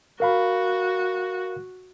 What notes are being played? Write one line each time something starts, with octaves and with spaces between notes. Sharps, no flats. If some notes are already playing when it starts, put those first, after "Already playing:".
F#4 A#4 F5 B5